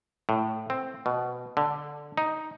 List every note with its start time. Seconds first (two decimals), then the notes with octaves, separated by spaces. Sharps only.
0.29 A2
0.70 C4
1.06 B2
1.57 D3
2.18 D#4